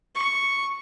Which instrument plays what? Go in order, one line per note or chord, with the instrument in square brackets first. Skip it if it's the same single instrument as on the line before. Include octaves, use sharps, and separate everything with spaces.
[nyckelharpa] C#6